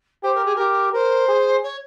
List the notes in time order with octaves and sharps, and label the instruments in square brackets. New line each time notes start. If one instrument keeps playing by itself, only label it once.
[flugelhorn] G4 [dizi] C5
[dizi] A#4
G#4
[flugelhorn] G4 [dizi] A#4
[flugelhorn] A#4 [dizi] C5
[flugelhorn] G#4
[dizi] C#5